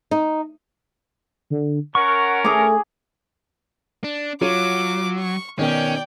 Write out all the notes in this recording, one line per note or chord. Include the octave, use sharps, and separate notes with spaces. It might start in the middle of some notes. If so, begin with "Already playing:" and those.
D#4
D3
C#4 A#4 F#5 C#6
A3 G#4 D6
D4
F#3 F4 C#5 D6 D#7
C#6
B2 D#3 C#4 D5 G5